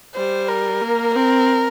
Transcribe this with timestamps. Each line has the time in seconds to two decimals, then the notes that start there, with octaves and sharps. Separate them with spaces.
0.15 G3 C5
0.48 A#4
0.82 A#3
1.15 C4 A#4